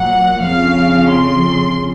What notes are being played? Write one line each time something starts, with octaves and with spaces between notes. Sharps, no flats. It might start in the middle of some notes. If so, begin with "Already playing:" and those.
Already playing: A#2 F#3 A#3 F#5
F2 C#3 F3 F5
C6